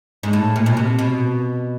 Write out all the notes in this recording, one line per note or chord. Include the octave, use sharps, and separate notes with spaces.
G#2
A2
A#2
B2
C3
B2